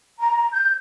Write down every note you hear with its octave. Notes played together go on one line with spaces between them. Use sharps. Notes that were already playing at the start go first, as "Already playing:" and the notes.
A#5
G6